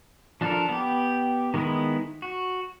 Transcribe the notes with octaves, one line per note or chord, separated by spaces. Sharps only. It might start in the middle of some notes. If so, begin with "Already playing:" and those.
F3 D4 F4 A4 A#4
B3 G4
D#3 G#3 B3 E4
F#4